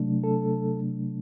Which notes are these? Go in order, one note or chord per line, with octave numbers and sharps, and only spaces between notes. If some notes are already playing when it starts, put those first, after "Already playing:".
Already playing: C3 F#3 A3 D4
A4